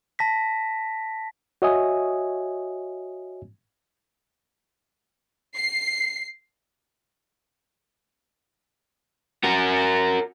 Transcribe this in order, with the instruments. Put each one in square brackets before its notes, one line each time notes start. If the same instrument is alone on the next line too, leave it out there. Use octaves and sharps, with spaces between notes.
[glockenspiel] A5 A#6 B6
[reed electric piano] F#4 C#5 D#5 E5 G#5 D#6
[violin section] C7
[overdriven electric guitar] F#4 A#4